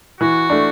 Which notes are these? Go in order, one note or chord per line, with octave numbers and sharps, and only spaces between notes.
E3 F#4
A3 D4